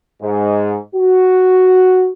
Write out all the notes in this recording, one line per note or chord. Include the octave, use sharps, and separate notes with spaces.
G#2
F#4